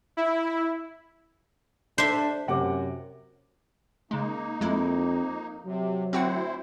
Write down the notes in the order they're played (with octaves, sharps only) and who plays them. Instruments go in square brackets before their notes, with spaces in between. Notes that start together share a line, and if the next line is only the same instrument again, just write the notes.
[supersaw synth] E4
[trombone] D4 [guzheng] C5 E5
[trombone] F#2 [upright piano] C3 F#5 D6
[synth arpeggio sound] C#3 G#3 [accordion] A#3 D#4
[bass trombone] F2 [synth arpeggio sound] G#3 E4
[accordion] C3 [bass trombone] F#3
[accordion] D2 E4 C5 [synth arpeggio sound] C4 F#4 F#5